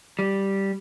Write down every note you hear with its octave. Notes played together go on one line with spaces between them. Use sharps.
G3